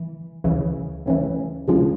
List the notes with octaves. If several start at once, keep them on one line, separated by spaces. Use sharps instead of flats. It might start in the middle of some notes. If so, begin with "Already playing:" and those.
Already playing: E3
D2 C#3 E3
D2 C#3 E3
D2 C#3 F3 G#3